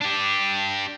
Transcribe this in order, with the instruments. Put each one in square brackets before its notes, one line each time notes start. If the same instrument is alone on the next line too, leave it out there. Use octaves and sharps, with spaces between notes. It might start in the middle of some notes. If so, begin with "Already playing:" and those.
[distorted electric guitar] D4 G4